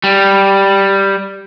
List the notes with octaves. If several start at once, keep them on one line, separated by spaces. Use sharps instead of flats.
G3